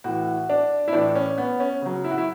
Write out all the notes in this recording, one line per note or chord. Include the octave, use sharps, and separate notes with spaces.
A2 E3 F#4
D4
E4
A2 E3 D4
C#4
B3
C#4
C#3 F#3
E4
F#4
E4